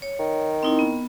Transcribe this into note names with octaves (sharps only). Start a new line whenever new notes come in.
C#5
D#3
C4 D#4 E4
B3